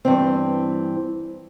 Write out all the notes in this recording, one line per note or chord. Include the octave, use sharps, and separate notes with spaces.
G2 E3 C4